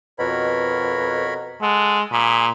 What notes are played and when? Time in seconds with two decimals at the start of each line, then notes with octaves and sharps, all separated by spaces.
0.19 F2 B2 A#4 C#5 B5
1.62 G#3 A4 F#5
2.12 A#2 G#4 B5